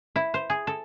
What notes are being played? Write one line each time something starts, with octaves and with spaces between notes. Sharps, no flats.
E4
C5
G#4
A4